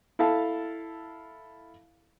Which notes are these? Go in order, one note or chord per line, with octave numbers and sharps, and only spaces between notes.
E4 A4 F5 A5